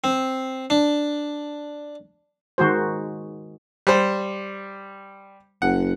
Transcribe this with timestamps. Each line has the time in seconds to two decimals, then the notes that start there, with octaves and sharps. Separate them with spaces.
0.04 C4
0.70 D4
2.58 D#3 G#3 F#4 C5
3.87 G3 C5
5.62 F#1 F#5